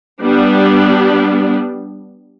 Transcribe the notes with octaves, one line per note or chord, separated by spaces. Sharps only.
G3 B3 D4